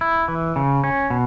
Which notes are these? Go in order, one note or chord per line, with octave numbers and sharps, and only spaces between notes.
E4
E3
C#3
C#4
B2